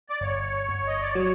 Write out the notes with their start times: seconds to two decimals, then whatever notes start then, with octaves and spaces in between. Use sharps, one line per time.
0.09 D5
0.21 G1 C#5
0.69 G1
0.87 D#5
1.02 D5
1.15 F#3 C#5